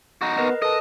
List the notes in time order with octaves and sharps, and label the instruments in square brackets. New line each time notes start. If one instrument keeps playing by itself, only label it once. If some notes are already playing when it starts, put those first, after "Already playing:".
[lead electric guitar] D#4 F#4
[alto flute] B3 [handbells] A#4 B4 D#5
[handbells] A4 A5 [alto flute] B4 [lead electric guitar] D#5